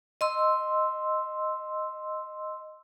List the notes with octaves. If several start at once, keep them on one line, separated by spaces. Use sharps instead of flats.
D#5 C6 E6